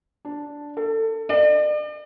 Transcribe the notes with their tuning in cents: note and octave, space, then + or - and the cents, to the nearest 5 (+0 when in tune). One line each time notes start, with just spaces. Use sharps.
D4 -5
A4 +25
D5 +40